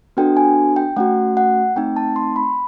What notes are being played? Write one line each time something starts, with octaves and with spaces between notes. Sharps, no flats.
B3 D4 F#4 A4 G5
G#5
G5
A3 C#4 F#4 F#5
F#5
A3 C4 D#4 G5
A5
C6
B5